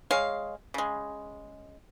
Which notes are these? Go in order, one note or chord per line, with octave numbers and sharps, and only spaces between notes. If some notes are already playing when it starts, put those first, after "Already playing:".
G#3 G#4 C#5 F5
C#3 G#3